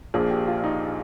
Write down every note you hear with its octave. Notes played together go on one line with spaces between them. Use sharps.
A#1 A#2 F3 G#4
G4
F4
D#4